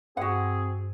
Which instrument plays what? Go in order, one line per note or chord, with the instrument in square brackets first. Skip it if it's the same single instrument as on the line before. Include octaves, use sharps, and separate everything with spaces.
[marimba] G2 [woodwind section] C4 G#4 [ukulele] F#4 F#5